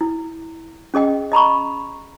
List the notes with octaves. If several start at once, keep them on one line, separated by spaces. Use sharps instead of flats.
E4
C#4 G#4 D#5 G5
D#5 A#5 B5 C#6